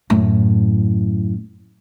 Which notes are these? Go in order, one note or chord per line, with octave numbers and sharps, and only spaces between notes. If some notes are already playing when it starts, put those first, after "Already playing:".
F#2 A2